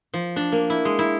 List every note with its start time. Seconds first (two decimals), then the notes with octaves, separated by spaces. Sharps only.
0.14 F3
0.36 D4
0.52 A#3
0.70 E4
0.85 G#3
0.99 E4